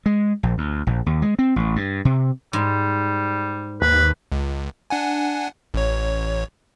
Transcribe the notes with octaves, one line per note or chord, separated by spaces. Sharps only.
G#3
A#1
D2
A#1
D#2
G#3
C4
A1
G2
C3
G#2 G3
D#2 B4
C#2
D4 F#5 G#5
A1 C#5